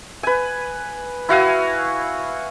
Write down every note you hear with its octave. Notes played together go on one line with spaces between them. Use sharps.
B4 G#5
E4 F#4 F5 G#5